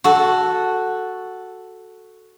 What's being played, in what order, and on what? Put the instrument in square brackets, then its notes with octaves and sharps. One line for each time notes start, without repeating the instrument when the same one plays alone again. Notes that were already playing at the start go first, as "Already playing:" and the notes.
[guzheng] F#4 A4